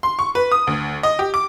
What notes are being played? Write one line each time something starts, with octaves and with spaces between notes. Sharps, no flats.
C6
C#6
B4
D#6
D2
D#5
G4
D6